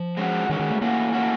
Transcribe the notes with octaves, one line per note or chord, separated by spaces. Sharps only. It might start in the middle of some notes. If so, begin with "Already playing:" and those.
Already playing: F3
G#3 C#4 F#4
D#3 G#3 C#4 F#4
D#3
A3
E3 A3 A#3 C#4 F#4
E3 A3 C#4 F#4